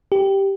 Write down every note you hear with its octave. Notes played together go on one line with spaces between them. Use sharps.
G4